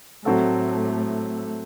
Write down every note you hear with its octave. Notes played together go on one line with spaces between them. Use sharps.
A2 F#3 A3 C4 F#4 A4